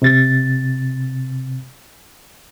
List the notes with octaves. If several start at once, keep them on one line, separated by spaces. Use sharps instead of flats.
C3 A6